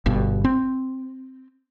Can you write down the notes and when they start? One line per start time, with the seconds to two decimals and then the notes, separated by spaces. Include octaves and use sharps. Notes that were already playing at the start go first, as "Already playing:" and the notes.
0.06 G1 G2 B2
0.44 C4